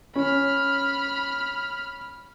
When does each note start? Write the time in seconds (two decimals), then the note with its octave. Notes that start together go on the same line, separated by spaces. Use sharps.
0.16 C#4 B5 F6